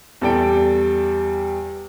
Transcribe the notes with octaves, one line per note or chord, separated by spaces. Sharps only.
E2 G3 A4 D5 G5 D7